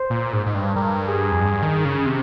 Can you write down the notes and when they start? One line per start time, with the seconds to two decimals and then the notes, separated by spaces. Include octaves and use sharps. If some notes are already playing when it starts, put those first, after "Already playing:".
Already playing: C5
0.10 A#2
0.33 G#2
0.46 G#2
0.55 G2
0.76 G2 A#4
1.08 G#4
1.31 F2
1.41 G2
1.62 D#3
1.85 C#3
2.06 C3